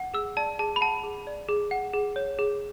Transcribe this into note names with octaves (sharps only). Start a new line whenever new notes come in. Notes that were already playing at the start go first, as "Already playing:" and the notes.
Already playing: F#5
G#4 E6
D5 A5
G#4 A5
B5
F#5 A5
G#4
D5
G#4
F#5
G#4
C#5
G#4